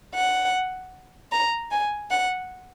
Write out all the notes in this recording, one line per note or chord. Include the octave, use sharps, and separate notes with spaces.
F#5
A#5
G#5
F#5